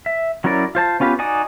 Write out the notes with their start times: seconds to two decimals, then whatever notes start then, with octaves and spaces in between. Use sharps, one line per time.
0.06 E5
0.44 F#3 C#4 E4 A#4 D5
0.75 F4 C5 A5
1.00 B3 C#4 F4 G4 B4
1.19 D#4 F#4 D5 G#5 D#6